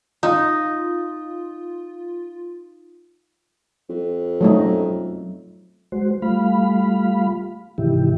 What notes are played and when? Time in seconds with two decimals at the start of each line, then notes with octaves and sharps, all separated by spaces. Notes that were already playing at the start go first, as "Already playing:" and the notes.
0.23 D#4 F4
3.90 F2
4.41 F#3 A3 D#4
5.92 G#3 F#4 C5
6.22 G3 A3 F4 F5 B5
7.78 G#2 C3 D#3 E3 E4 G4